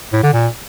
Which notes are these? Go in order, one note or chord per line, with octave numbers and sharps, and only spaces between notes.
A2
D3
A#2